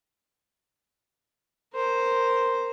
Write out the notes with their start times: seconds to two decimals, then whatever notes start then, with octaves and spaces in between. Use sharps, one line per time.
1.73 A#4 C5